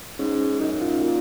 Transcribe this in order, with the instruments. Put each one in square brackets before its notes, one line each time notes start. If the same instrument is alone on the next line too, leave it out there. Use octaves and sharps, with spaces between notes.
[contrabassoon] G#2 [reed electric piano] C#4
[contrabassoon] F#2 [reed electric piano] D#4
[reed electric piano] F4
[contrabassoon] A#2